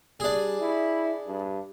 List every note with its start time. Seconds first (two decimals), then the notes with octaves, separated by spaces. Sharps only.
0.20 G3 D4 G#4
0.61 E4
1.27 G2